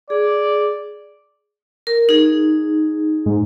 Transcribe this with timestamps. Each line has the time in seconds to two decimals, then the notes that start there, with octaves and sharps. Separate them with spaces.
0.10 G#4 D5
1.87 A#4
2.09 D#4 G#4
3.26 G#2